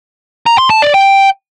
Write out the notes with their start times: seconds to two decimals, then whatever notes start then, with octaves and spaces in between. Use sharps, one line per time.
0.46 A#5
0.58 C6
0.70 A5
0.82 D5
0.94 G5